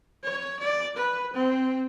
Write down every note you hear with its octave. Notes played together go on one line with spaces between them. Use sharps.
C#5
D5
B4
C4